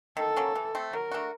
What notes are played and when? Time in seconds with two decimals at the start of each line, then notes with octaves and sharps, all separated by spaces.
0.17 D#3 A4
0.36 F#3 A#3 C#4
0.55 E3
0.75 A3 C4
0.93 F#3 A#4
1.12 A3 D4 F#4